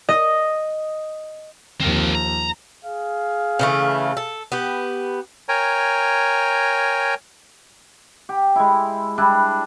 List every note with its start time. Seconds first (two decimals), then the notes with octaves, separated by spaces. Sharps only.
0.09 D#5
1.81 D#2 F3 C4 A#4
2.15 A#5
2.84 G#4 F5
3.59 C#3 E3 A3
4.17 A4
4.52 B3 G4
5.49 A#4 C#5 G5 G#5 A#5
8.29 G4
8.56 G#3 E4
9.18 G3 D4 E4